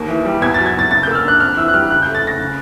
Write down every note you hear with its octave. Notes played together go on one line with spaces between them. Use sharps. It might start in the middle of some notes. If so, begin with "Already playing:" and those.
Already playing: D#2 A#3
E3
G3
E2 G#6
A6
F#3
G#6
E2 A6
C#3 A6
G6
A#3 E6
F6
D4 F#6
F2 F6
E3 E6
F#6
G3 F6
C#3 F#6
G6
A3
A6
C#3 A#6
C#3